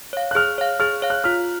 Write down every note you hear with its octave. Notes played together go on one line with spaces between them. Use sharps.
C#5 F5
F#6
G#4 F6
C#5 F5
G#4 F6
C#5 F5
F#6
F4 F6